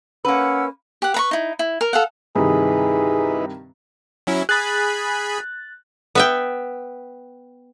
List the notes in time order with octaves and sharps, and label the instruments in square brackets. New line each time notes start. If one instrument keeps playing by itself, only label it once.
[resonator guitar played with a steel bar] A#3 B4 [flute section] C#4 F#5 E6
[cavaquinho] G4 F#5
B4 A#5 C#6
D#4 E4
E4
A#4
A4 F5 F#5
[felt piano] G2 C3 D#3 [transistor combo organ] D#4 E4 B4 [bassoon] G#4
[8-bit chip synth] F#3 C#4 E4
[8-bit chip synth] G#4 B5 [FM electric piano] F#6 A6
[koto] B3 E5 G5